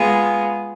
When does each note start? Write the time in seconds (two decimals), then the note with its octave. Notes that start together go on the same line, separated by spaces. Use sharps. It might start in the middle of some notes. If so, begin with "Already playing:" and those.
Already playing: G#3 B3 F4 G#4